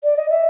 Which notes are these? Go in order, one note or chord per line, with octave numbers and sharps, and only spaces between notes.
D5
D#5
E5